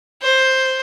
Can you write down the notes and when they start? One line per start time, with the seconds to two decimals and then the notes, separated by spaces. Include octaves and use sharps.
0.22 C5